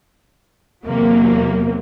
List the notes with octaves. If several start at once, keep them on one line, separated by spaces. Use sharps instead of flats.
E2 C3 F#3 A#3